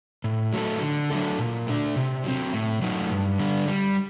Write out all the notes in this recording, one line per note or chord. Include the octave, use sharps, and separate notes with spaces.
A2
F#3 A3 D#4 A4
D3
F#3 A3 D4 A4
A#2
A3 D4
C3
F#3 C4
A2
F#3 A3 D#4
G2
D3 G3 D4
G3